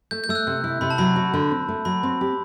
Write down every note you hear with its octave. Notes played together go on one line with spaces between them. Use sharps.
A3 G6
G6
A3 E6
F#6
C3
E4
C3 B5
A5
F#3 B5
F#4
D3
C4
A3
F#3 B5
C4
G4